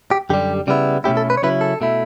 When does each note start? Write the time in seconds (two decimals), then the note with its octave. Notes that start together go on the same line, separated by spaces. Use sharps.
0.11 G4
0.30 F#2 D3 G3 G4
0.67 C#3 G3 B3 E4
1.04 B2 A3 C#4 E4 G4
1.17 A4
1.30 B4
1.37 C#5
1.42 C#3 F#3 C#4 E4 B4
1.61 A4
1.81 B2 A3 E4